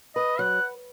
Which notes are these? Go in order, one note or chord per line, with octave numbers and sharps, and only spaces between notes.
B4 D#5
F#3 F#5